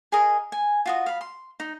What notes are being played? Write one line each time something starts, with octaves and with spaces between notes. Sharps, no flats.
G#4 A#4 D#5
G#5
F4 F#4 D#5
F5 B5
C6
D#4